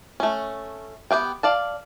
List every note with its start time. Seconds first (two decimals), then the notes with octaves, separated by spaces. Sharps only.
0.20 A3 C#4
1.11 B3 G4 F5 G5
1.43 D5 F5 A5